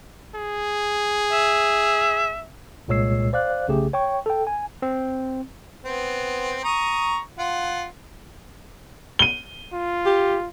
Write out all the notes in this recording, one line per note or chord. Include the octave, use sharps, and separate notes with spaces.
G#4
E5
C2 A#2 G#3 C#5 E6 C7
C5 D5 F5 F#6
B1 C#3 A3 G4 G#4
C#5 G5 C#6
A4 G5
G#5
C4
B3 C4
A#5 C#6 D#6
F4 F#5
D#7 G7
F4
G4